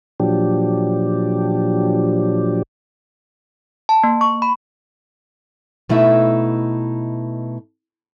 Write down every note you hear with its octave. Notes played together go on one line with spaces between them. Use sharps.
A#2 F3 F#3 D4 G4
A5
A#3
C#6
B5
B2 A3 D#4 E4 E5